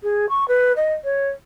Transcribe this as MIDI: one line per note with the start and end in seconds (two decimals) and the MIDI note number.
0.02 0.26 68
0.29 0.47 85
0.48 0.72 71
0.76 0.93 75
1.03 1.28 73